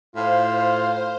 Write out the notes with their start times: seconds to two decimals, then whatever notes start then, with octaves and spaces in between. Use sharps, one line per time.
0.16 A2 F4 C5 F5